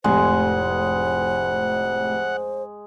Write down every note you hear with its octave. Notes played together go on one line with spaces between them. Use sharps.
F1 F2 A2 G#3 C5 F#5